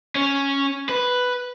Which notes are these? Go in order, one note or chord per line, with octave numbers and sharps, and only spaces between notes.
C#4
B4